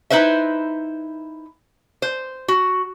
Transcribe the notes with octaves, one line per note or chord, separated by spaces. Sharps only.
D#4 E4 B4 C5 E5
C5
F#4